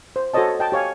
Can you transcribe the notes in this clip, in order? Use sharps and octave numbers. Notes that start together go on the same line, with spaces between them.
C5
F#4 A4 C5 C#5 D#5 A5
D#5 G5 A5
G4 C#5 F5 G#5